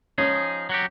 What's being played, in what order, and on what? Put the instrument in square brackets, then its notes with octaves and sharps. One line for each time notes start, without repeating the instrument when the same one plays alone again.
[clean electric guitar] F3 D#4 G#4 [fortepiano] C#4
[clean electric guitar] F#3 F#4 G4